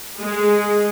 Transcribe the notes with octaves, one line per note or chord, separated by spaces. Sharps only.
G#3